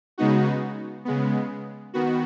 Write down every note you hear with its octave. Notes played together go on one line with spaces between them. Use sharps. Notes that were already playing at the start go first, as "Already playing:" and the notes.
C#3 G#3 B3 D#4 F#4
C#3 G#3 B3
D#3 B3 F#4